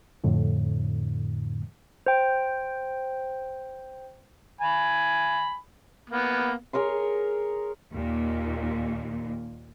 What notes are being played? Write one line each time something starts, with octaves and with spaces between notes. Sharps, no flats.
F2 A2 D3
C5 G5
G#5 B5
A#3 B3
G#4 A#4 C#5 C6
D#2 A#2